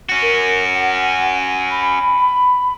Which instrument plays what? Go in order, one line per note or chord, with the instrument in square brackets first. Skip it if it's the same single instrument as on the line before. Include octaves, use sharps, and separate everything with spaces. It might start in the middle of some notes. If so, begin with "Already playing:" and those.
[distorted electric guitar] C#4 F#4
[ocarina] A#4
F#5
B5